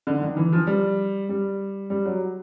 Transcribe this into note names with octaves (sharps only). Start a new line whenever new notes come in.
D3
D#3
E3
F3
G3
G3
G3
F#3